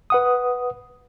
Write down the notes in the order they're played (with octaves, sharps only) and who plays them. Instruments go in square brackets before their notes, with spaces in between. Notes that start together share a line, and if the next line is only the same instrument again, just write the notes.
[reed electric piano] B4 F#5 D#6